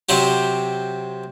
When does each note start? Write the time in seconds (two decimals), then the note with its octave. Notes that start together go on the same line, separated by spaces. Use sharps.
0.09 C3 F#3 C4 G4